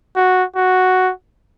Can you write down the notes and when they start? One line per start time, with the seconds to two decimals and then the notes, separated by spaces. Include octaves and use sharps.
0.16 F#4
0.56 F#4